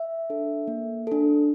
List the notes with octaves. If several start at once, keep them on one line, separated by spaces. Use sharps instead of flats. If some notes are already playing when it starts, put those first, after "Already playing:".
Already playing: E5
D4 A4
A#3
D4 A4